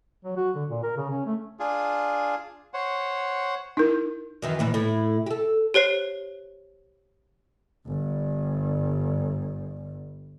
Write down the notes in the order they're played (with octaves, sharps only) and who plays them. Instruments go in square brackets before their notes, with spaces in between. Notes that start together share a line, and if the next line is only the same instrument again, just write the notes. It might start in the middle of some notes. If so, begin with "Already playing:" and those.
[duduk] F#3
F#4
D3
A#2
A#4
C#3
C#4
A3
[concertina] D4 F4 G#4
C5 C#5 F#5
[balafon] D#4 E4 A#4
[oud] F#2 D#3 E3
D#2 A#2 E3
A2 E4
G4 A4
[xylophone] G4 C5 C#5 C7
[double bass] G1 G2